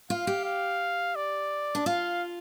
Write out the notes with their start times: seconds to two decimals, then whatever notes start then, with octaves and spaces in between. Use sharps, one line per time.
0.10 F4 F5
0.27 G4
0.45 F5
1.16 D5
1.75 D4
1.86 F4 F5